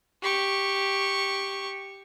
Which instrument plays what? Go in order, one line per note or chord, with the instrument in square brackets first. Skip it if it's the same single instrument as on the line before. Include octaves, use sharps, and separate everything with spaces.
[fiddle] G4 C#6